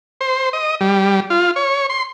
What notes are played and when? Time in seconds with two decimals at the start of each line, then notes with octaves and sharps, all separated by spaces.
0.21 C5
0.53 D#5
0.81 G3
1.30 F4
1.56 C#5
1.89 C6